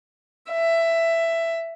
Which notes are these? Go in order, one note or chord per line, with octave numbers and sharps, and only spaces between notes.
E5